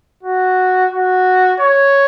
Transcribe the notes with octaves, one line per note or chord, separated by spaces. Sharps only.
F#4
F#4
C#5